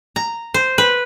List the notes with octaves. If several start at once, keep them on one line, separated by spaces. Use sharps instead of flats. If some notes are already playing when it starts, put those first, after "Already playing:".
A#5
C5
B4